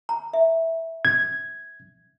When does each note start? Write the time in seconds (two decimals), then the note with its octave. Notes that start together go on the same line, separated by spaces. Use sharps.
0.09 A#5
0.33 E5
1.05 G#6